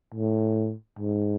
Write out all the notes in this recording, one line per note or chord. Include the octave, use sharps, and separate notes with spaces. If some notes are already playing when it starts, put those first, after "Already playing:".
A2
G#2